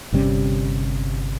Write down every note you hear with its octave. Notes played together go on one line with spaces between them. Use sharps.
G1 C3 G3 C#4